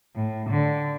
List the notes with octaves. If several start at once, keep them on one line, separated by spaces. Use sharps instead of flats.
A2
D3